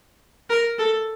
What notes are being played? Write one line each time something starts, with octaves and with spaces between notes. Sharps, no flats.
A#4
A4